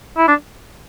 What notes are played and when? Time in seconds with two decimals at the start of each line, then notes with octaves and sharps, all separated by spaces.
0.17 E4
0.28 D4